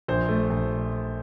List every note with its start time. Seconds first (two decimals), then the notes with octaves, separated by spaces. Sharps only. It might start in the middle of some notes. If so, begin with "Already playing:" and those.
0.08 A#1 C5
0.28 A3
0.50 A#1